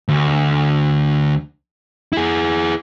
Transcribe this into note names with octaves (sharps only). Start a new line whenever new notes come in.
D2
E4 G#4